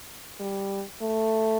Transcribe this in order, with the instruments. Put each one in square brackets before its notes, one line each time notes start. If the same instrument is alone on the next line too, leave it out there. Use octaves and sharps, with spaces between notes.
[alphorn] G3
A3